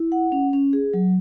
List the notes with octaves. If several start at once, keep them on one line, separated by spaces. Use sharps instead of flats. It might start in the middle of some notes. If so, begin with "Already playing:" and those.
Already playing: E4
F#5
C#4
C#4
G#4
F#3